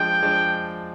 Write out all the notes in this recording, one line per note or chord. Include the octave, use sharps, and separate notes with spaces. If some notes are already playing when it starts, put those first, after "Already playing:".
Already playing: F3 G#3 D4 G5
F3 G#3 D4